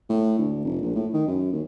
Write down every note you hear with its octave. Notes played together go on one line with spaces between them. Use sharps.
A2
D2
F1
A#1
A2
D#3
F#2
D#2